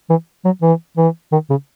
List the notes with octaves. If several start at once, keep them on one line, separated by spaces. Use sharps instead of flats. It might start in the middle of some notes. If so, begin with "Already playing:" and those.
E3
F#3
E3
E3
D#3
C#3